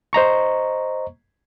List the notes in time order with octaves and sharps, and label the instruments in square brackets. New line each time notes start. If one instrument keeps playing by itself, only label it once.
[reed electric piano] C5 D#5 A#5 C#6